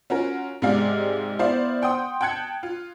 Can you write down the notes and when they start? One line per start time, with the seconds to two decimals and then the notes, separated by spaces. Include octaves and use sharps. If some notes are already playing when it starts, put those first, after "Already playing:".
0.10 C#4 F4 F#4 A#4
0.62 G#2 C3 G#3 D5 F5 F6
1.39 B3 E4 C5 D5 F5
1.82 F#5 G5 C6 D#6
2.21 G5 A5 F#6 G#6 C#7
2.63 F4